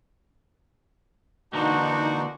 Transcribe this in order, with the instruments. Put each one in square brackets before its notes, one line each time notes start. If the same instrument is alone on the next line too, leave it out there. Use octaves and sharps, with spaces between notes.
[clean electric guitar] D3 E3 A#3 [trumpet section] D4 F#4 [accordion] D#4